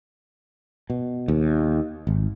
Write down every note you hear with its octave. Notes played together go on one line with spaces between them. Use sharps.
B2
D#2
G#1